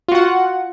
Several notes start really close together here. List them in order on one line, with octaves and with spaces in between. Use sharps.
F4 F#4 F#5